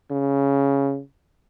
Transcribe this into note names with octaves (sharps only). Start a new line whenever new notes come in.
C#3